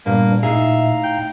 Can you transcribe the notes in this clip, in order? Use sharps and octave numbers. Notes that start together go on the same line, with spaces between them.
G2 A#2 A#3 B3 D4
A2 D#4 G#4 E5 F5 A#5
G5